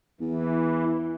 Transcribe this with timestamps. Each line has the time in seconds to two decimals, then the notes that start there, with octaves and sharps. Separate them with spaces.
0.21 E2 E3